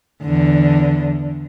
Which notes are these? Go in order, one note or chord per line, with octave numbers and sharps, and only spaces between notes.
E2 D3